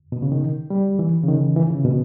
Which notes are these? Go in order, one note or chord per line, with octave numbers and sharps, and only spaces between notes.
B2
C#3
D#3
G3
E3
C#3
D#3
E3
C#3
B2